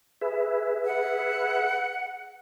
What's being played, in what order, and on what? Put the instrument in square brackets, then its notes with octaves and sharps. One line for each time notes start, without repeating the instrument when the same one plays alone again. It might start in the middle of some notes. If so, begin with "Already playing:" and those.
[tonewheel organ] G#4 B4 E5
[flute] F#5